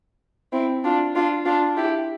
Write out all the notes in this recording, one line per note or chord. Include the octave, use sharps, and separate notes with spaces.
C4 E4
D4 F4
D4 F4
D4 F4
E4 G4